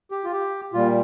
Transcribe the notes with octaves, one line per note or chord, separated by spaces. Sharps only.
G4
F4
G4
A#2 G3 F4